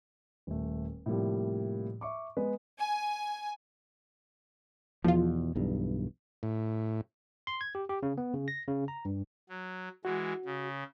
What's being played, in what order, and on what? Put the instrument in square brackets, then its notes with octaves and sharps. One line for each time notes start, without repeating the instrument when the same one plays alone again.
[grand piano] D#1 A3
A2 C3 F3 G3 A#3
E5 C#6 D6
G#3 B3 B4
[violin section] G#5
[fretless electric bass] E2 B2 [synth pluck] F3 F4
[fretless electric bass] B1 E2 G2
[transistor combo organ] A2
[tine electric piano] C6
G#6
G4
G4
C#3
B3
C#3
A#6
C#3
A#5
G2
[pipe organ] F#3
[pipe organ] E3 G#3 [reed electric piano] F#4
[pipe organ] C#3